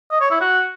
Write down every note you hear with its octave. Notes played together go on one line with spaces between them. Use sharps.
D#5
C#5
E4
F#4